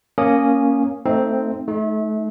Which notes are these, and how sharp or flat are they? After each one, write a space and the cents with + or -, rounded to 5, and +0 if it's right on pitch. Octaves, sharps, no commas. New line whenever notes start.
A#3 +0 C#4 +0 D#6 -10
A3 +20 C4 +0 D#4 +10
A3 -30 D#4 +15